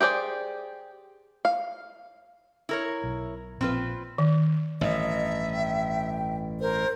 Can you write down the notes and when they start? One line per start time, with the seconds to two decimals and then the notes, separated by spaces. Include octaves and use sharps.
0.01 G4 G#4 C5 D5
1.45 F5
2.69 E4 A#4 C#5
3.04 B1
3.61 A#1 C4 F4 B4
4.18 D#3
4.81 A1 G2 D#5 E5
5.53 G5
6.60 A#4 C5